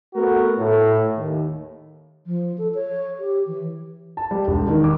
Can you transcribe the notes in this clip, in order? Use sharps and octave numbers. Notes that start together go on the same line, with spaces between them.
A3 B3 F#4 A#4
A2
D#2
F3
A4
C#5
G4
E3
A5
G3
E1
D#3
D6